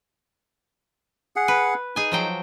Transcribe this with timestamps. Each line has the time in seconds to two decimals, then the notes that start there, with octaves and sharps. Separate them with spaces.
1.36 G#4 F#5
1.48 B4
1.96 D#4 G#4 G#5
2.12 F3 F#3 G5